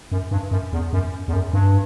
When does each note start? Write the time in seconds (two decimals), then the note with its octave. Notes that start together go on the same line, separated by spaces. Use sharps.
0.12 F#2
0.31 G2
0.51 F#2
0.73 E2
0.93 F#2
1.28 E2
1.33 F#2
1.53 G2